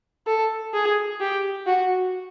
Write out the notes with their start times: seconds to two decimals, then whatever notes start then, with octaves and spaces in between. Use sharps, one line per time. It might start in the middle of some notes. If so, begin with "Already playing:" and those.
0.27 A4
0.74 G#4
1.20 G4
1.66 F#4